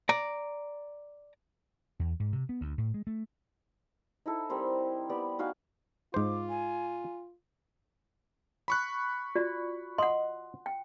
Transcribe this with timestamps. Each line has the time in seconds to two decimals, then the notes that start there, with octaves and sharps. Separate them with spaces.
0.09 D5 A#5
2.00 E2
2.20 G#2
2.33 C3
2.49 B3
2.61 D2
2.78 A2
2.94 G#3
3.07 A3
4.26 D#4 E4 A4
4.50 G3 C4 A#4 C5
5.09 B3 G4 D5
5.39 D#4 F#4 F5 G#5
6.14 G#2 F4 C5 D6
6.49 G#5
8.68 B5 C#6 F#6
9.35 F4 F#4 D5
9.98 D#5 F#5 C6
10.66 G5